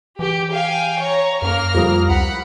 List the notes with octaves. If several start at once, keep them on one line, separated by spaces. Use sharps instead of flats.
E3 G4
F5 G5 G#5
C#5 A#5
F#2 A#3 A#5 F6
F2 F3 G3 D#6
C#2 F#5 B5